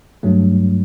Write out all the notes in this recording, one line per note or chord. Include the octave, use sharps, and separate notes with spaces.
G2 F#3 A3